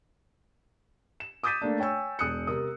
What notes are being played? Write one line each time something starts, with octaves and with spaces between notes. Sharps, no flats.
E7
D6 D#6 G6 A6 B6 D#7
A3 A#3 D4
C#5 G5 G#5 C#6 E6
E1 D#6 F#6 C#7
C3 A#4 D#6